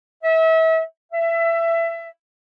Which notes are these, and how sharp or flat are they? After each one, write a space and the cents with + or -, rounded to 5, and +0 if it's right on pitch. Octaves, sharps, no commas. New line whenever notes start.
E5 -35
E5 +20